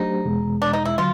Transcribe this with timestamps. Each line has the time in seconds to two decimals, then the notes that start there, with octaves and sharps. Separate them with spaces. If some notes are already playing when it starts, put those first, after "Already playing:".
Already playing: F#3 A3 D4 D#4 G4 C5
0.26 E2 B2 G#3
0.62 D4
0.73 D#4
0.85 E4
0.97 D3 F#3 F4